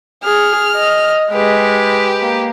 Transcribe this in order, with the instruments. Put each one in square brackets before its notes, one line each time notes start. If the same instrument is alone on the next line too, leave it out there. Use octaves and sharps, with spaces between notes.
[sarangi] G#4 [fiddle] F6
[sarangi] D#5
[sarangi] G#3 [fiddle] G4 B4
[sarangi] A#3